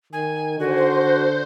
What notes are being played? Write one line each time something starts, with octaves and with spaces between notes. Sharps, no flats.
D#3 G#5
D3 F#4 C5